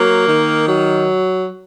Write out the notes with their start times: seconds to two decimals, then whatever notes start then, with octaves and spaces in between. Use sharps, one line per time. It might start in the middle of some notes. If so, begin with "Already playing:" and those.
Already playing: F#3 A#3
0.27 D#3
0.66 F#3